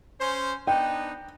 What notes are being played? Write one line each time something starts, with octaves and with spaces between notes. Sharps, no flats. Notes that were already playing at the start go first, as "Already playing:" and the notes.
C#4 C5
B3 D4 D#4 G5